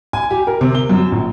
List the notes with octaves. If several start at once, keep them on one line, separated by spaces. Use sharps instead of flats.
G#5
G4
A#4
C3
G7
F#2
A#1